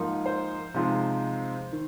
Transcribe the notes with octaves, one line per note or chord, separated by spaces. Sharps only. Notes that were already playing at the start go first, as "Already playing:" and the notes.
Already playing: G#2 F3 A#3 D#4
C5
C3 F3 G#3 D#4
D#3